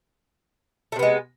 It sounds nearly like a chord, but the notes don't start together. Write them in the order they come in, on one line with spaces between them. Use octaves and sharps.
A3 C3 B3 G#3